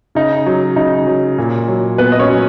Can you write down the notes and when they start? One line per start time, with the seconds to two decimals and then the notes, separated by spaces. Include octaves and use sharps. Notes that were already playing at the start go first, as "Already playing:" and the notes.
0.15 C#3 D#4
0.46 F#3
0.76 C#3 D#4
1.07 F#3
1.38 A#2
1.68 F#3
1.98 A#2 B3 B4
2.12 D#5
2.19 C#4 C#5
2.29 F#3